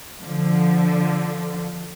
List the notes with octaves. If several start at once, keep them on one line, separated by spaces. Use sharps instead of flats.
D3 F3